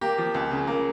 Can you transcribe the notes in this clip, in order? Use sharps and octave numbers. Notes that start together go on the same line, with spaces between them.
A#3 G4
F3
C#2
C#3
A#3